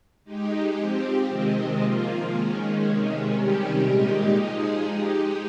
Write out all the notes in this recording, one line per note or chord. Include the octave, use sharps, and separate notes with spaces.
G#3 D#4 G4
F3 C4 G4
C3 D#3 G#3 C4 D#4
F3 A#3 F4
D#3 G#3 C#4
C3 D#3 G#3 C#4
C3 D#3 G3 C#4 G4
A#2 G#3 D#4 G4
F3 G#3 D#4 G#4
G#3 D#4 G4